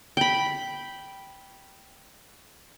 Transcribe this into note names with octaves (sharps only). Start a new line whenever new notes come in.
G5 B5